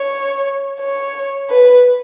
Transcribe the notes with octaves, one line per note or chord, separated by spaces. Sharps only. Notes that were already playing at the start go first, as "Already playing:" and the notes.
Already playing: C#5
C#5
B4